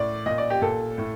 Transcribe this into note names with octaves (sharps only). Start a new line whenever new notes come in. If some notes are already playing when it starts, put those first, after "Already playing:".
Already playing: A2 D5
A#2 D#5
D5
G4
A#2 A4
A2